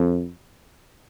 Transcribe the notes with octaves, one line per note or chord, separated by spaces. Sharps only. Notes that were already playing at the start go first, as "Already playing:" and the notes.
Already playing: F2